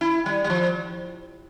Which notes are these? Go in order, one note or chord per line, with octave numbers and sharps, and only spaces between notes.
E4
G3
G3
F3